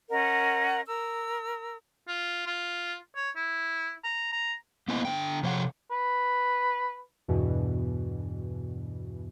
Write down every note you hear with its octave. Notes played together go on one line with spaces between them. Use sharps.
C#4 A#4 D#5 F#5
A#4 E6
F4
F4
C#5
E4
A#5
A#5
A#3 B3 E4 C5 D#5 G#5
D3 G5
C3 F3 C#5 D5 F#5
B4
E2 G2 B2 E3